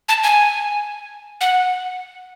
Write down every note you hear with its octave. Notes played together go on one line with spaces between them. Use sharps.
A5
G#5
F#5